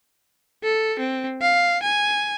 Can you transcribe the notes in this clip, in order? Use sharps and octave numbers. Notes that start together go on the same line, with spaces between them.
A4
C4
F5
G#5